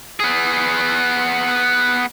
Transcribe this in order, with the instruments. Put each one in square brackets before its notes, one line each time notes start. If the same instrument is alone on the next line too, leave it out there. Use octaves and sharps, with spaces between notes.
[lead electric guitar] B3 G#4